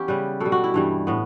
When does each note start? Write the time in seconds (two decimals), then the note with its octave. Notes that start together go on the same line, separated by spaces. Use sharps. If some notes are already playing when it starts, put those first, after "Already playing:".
Already playing: E3 B3 C#4 G4
0.08 C#3 G3 B4
0.40 B2 G3 A4
0.52 F#4
0.64 E4
0.74 G2 E3 G3
1.07 A2 B3